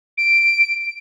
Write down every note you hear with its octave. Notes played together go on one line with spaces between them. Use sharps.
D7